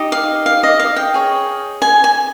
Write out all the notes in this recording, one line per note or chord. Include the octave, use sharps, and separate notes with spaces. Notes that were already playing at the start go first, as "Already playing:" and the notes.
Already playing: D#4 G4 D#5
F5
F5
D#5
F5
G5
G#4 C#5
G#5
G#5